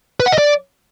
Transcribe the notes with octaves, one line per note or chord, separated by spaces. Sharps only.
B4
F#5
D#5
D5